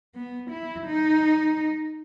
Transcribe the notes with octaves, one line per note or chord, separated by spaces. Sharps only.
B3
E4
D#4